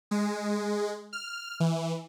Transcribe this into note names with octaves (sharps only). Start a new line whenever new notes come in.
G#3
F6
E3